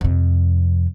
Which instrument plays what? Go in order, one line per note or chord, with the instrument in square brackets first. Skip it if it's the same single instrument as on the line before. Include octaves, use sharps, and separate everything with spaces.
[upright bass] F2 C3